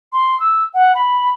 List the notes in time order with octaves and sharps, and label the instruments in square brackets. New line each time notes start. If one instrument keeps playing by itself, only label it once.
[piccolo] C6
E6
F#5
B5